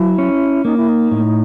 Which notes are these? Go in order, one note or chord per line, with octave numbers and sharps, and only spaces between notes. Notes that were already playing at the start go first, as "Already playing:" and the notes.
Already playing: F#3 E4
C#4
A#3 D#4
E4
D#4
A2